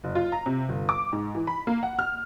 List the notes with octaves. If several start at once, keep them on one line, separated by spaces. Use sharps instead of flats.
F#1
F4
A#5
C3
G1
D6
G#2
E3
B5
A#3
F#5
F6